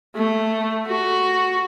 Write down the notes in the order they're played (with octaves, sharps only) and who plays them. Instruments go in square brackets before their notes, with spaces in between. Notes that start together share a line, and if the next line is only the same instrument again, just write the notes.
[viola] A3
F#4